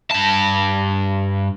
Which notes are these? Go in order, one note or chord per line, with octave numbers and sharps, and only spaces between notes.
G2 A5